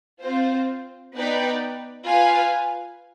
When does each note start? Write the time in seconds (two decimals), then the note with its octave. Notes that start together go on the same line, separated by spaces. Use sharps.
0.22 C4 F4 C5
1.15 B3 D#4 B4 D5 G5
2.07 F4 B4 F5 G#5